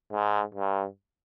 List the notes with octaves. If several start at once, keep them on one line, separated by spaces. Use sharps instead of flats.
G#2
G2